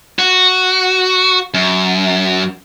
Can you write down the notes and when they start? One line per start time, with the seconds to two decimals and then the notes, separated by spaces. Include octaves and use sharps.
0.19 F#4
1.54 F#2